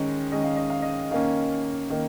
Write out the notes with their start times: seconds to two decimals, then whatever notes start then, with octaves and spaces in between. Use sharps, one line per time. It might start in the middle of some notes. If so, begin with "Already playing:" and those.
Already playing: D#3 G#3 C#4
0.32 D#3 G#3 C#4 D#5
0.44 F5
0.56 D#5
0.70 F5
0.82 D#5
1.11 D#3 A#3 C#4 F5
1.90 D#3 A#3